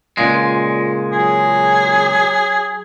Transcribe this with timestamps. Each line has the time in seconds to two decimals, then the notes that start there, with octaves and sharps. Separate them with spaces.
0.17 C#2 A#2 G#3
1.12 F#3 G#4